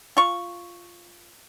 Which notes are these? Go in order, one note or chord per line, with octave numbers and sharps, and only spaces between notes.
F4 C#6